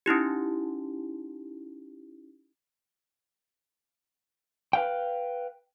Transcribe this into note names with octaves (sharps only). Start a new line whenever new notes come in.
C#4 D#4 E4 G4
B4 F5 G5